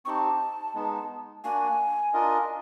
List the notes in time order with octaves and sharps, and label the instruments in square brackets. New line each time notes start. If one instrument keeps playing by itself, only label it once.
[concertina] C4 D#4 G4 [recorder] A5 C#6
[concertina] G#3 B3 D#4
[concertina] A#3 D4 F#4 [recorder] G#5
[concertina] D4 F4 A#4 D#5